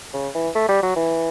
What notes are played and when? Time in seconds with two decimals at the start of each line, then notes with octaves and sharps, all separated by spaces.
0.14 C#3
0.35 E3
0.55 A3
0.69 G3
0.83 F#3
0.96 E3